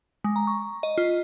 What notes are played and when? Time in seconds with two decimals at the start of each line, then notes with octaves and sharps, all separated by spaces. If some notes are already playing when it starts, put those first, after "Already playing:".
0.24 G#3
0.36 A#5
0.47 C#6
0.83 D#5
0.98 F4